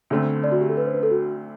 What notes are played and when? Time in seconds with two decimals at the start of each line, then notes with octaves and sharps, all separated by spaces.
0.10 D2 D3 A3 C4
0.44 D5
0.52 F#4
0.61 G4
0.69 A4
0.77 B4
0.86 C5
0.94 B4
1.03 A4
1.11 F#4